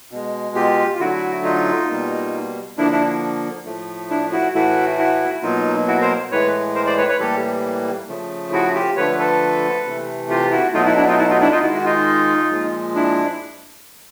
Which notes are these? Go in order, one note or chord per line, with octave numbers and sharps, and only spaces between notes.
B2 G#3
F4 G4
F4
D3 F#3 A3 E4 F#4
D#4 F4
B2 G3 A#3
D3 F3 A#3 D4 E4
D4 E4
A2 F3 A3
D4 E4
E4 F#4
A2 E3 A3 E4 F#4
E4 F#4
B2 F#3 A#3 D#4 F4
E4 F#4
A#4 C5
A2 E3 G#3 B4 C#5
A#4 C5
C5 D5
B4 C#5
B4 C#5
A2 E3 G3 A#3 G4 A4
C#3 F3 A3
E4 F#4
F4 G4
D3 F3 A3 B4 C#5
A4 B4
C3 E3 A3
F4 G4
E4 F#4
B2 F#3 A3 D#4 F4
E4 F#4
D4 E4
D#4 F4
E4 F#4
D#4 F4
D4 E4
D#4 F4
D#3 G#3 E4 F#4
F#4
D#4 F4
A#2 F3 G#3
D4 E4